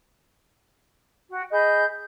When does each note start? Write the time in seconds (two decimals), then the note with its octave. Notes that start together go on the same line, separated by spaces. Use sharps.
1.31 F#4 G5
1.51 G#4 D#5 B5 G6